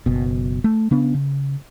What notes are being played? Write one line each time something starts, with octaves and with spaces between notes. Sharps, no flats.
F#1 B2
A3
C#3 B3 D4
C#3